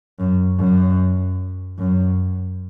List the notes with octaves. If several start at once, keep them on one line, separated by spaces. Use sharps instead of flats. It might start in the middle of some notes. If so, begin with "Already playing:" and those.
F#2
F#2
F#2